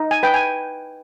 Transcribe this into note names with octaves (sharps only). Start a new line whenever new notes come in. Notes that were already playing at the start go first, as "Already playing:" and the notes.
Already playing: D#4
G#5
B4 G5
G#5